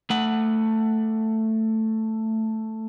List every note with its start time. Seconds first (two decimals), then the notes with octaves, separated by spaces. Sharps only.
0.10 A3 F#5